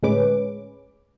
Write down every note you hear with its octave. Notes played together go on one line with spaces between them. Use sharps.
D2 A2 G#3 C#4 B4 D6